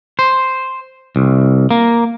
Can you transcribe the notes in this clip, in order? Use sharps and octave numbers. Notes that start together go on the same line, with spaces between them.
C5
C2
A#3